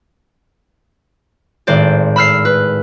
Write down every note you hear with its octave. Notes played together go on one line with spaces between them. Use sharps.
G#1 A2 C5 D5
B5 E6 F6 C7
B4